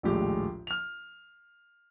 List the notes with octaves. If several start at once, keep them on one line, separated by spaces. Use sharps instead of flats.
A#1 D#2 A2 G#3 G4
F6 F7